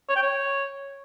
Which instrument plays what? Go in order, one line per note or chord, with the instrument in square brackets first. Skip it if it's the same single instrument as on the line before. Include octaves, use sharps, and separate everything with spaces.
[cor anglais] C#5
G5
C#5